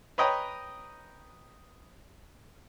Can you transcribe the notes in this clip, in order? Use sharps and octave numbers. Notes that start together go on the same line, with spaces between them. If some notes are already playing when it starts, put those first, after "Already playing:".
B4 C#5 D#5 G5 A#5